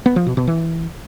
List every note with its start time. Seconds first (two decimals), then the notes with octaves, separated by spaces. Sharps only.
0.06 B3
0.16 F3
0.27 B2
0.37 B2
0.47 E3